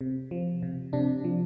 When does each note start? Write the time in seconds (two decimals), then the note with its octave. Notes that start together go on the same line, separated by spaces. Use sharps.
0.01 C3
0.31 F3
0.62 C3
0.93 C3 D4
1.24 F3